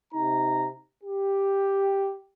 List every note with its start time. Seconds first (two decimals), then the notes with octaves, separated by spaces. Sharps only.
0.13 C3 D#4 A#5
1.03 G4